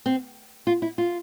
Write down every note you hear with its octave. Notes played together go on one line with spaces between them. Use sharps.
C4
F4
E4
F4